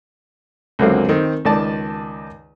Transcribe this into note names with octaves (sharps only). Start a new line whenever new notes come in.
C#2 F#2 D3 F#3 A#3 C4
D#3 C4
C#2 D#3 D5 A5